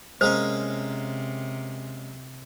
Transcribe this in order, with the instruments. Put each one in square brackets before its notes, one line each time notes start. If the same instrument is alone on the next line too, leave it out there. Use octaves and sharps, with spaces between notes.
[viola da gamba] C3 [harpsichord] G#3 A#3 C#4 [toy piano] C5